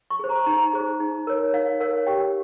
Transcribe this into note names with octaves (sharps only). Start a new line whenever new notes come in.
C#6
G#4 C5
A#5
D#4 A#5
G#4 C5
D#4
A#4 C#5
D#4 F5
A#4 C#5 F5
G4 G5